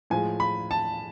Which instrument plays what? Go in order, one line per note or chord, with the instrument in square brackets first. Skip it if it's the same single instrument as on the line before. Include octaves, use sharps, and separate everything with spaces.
[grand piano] A2 F3 G#3 G#5
B5
A5